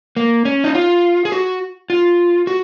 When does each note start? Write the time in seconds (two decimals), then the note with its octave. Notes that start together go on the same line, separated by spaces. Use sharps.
0.17 A#3
0.45 C#4
0.64 D#4
0.75 F4
1.25 G#4
1.32 F#4
1.90 F4
2.47 F#4